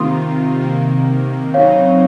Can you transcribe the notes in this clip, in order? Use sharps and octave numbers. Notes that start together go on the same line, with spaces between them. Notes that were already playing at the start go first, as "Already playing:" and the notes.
Already playing: C3 D#3 A#3 F4 C6 D#6
C3 D#3 A#3
C#3 F#3 C4 D#4 C#5 F5